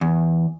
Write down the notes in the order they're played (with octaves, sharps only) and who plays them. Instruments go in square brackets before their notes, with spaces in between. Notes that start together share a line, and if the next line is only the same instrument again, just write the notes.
[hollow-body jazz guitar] E2